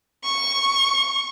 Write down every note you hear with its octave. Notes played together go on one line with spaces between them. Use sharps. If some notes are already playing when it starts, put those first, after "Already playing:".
C#6